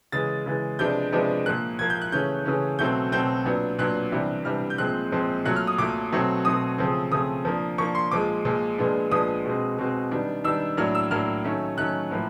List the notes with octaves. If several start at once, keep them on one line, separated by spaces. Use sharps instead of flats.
C#3 E3 G#3 A6
C#3 E3 G#3
C3 F3 G#3 B3 D4 G6
C3 F3 G#3 B3 D4
A#2 F3 A#3 F#6
A#2 F3 A#3 G#6
G6
F#6
C#3 E3 A3 C#4 G6
C#3 E3 A3 C#4
B2 F#3 A3 C4 G6
B2 F#3 A3 C4 G6
A#2 F#3 B3 D4
A#2 F#3 B3 D4 F#6
C3 E3 G3 B3 D4
C3 E3 G3 B3 D4 F6
G6
A#2 F3 G#3 C4 F#6
A#2 F3 G#3 C4
A#2 F#3 A3 F#6
F6
D#6
A#2 F#3 A3 D6
B2 F#3 A3 C4
B2 F#3 A3 C4 D#6
C#3 F3 A3 C4
C#3 F3 A3 C4 D#6
F3 A#3 D4
F3 A#3 D4 C#6
C6
A#2 F3 G#3 D6
A#2 F3 G#3
A#2 F3 G#3 B3 D4
A#2 F3 G#3 B3 D4 D#6
B2 G#3 C4
B2 G#3 C4
D#3 G3 B3 D4
D#3 G3 B3 D4 E6
A2 F#3 A#3 D4 F6
E6
A2 F#3 A#3 D4 F6
D#3 F#3 A3 C#4
D#3 F#3 A3 C#4 F#6
A2 F3 A#3